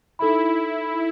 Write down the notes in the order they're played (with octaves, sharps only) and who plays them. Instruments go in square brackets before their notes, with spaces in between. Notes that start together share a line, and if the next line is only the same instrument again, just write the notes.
[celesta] D#4 A4 E5 B5 [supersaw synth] E4